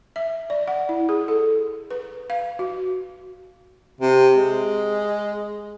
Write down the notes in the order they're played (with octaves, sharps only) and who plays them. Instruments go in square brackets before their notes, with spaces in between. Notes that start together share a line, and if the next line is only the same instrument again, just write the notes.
[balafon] E5
D5
F#5
E4
G#4
A4
B4
F5
F#4
[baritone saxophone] C3
G#3